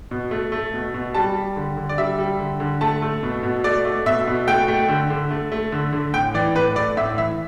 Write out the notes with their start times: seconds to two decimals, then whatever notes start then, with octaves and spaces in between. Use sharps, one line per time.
0.11 B2
0.31 A3
0.52 A3
0.74 B2
0.94 B2
1.15 G3 A5
1.36 G3
1.56 D3
1.77 D3
1.89 D5
1.98 G3 E5
2.18 G3
2.39 D3
2.60 D3
2.81 A3 A5
3.02 A3
3.23 B2
3.43 B2
3.64 A3 D5
3.85 A3
4.06 B2 E5
4.27 B2
4.47 A3 G5
4.68 A3
4.89 D3
5.10 D3
5.31 A3
5.52 A3
5.72 D3
5.93 D3
6.14 A2 G5
6.34 E3 D5
6.55 A2 B4
6.76 A3 D5
6.97 A2 E5
7.18 E3 E5